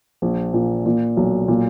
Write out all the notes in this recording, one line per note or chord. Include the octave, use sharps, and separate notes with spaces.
A#1
A#2
A#2
B1
A#2